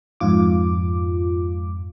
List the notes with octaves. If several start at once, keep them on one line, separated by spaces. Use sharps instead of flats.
F2 G#2 F4 D6